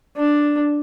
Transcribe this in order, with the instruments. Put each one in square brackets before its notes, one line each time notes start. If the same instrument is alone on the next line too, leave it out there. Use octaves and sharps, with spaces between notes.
[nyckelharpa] D4